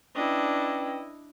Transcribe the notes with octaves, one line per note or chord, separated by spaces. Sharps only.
C#4 D4 E4 B4 D#5 G5